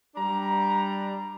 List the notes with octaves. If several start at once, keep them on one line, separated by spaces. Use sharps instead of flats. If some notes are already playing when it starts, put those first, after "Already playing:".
G3 D4 A#5